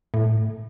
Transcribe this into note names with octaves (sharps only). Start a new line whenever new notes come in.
A2